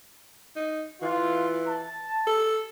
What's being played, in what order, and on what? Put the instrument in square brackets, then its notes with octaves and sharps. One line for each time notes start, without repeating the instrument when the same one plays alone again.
[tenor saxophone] D#4
[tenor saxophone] E3 [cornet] F4
[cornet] A5
[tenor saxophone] A4